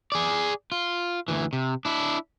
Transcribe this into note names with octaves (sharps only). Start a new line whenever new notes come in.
G#4 D5
F4
D2 E3
C3
D4 E4